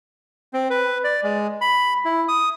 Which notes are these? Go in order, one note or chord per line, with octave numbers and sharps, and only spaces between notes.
C4
B4
D5
G#3
B5
E4
D#6